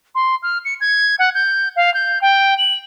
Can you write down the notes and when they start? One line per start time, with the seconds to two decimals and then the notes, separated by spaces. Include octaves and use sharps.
0.15 C6
0.43 F6
0.65 C#7
0.81 G#6
1.19 F#5
1.35 G6
1.76 F5
1.94 G6
2.22 G5
2.58 F#7